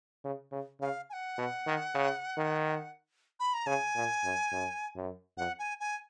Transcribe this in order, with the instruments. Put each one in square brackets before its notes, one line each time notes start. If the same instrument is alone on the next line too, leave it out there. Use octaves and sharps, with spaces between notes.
[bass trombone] C#3
C#3
[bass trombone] C#3 [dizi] F5
[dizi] G#5
F#5
[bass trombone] B2
D#3
C#3
D#3
[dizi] B5
A#5
[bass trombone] C#3 [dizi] G#5
[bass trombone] A#2
F#2
F#2
F#2
[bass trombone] F2 [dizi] F#5
[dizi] G#5
G#5